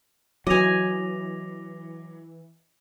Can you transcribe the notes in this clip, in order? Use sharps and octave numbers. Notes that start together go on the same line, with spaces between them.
E3 F#3 D#5 G#5 D6 A#6 F7